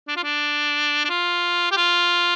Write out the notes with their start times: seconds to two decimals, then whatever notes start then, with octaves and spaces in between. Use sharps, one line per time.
0.08 D4
0.16 F4
0.24 D4
1.05 D4
1.09 F4
1.71 G4
1.77 F4